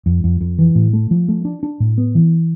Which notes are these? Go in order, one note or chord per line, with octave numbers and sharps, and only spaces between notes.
F2
F2
F2
E3
A2
A3
F3
A3
D4
D4
A2
B3
E3